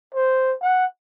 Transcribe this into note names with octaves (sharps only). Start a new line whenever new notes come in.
C5
F#5